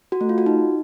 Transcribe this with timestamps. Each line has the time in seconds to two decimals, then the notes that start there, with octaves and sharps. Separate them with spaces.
0.12 F#4
0.21 A3
0.29 F4
0.38 F#4
0.46 D#4